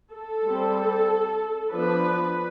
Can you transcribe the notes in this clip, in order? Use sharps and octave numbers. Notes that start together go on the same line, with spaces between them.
A4
G3 C4
F3 B3 D4 B4